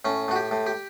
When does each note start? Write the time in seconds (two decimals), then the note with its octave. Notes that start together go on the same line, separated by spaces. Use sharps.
0.05 A2 C#4
0.28 A2 F#4
0.36 G4
0.51 A2
0.66 G4